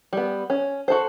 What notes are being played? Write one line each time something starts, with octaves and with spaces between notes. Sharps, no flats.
G3 B3
C#4
F#4 A4 C5